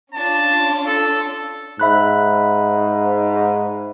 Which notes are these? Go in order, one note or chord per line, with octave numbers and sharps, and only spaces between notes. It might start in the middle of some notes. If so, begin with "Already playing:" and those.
C#4 D4 F4 A5
A4
G#2 E5 B5 F#6